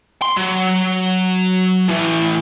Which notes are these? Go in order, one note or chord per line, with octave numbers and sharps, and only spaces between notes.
C6
F#3
A2 E3